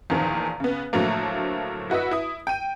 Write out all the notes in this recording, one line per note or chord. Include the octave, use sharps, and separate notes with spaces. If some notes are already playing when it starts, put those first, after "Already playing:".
E2 A#2 D#3 F3
C#3 B3
A2 D3 F3 F#3 A3 A#3
E4 F#4 B4 D#5 E5
E4 D#6
G5 D#7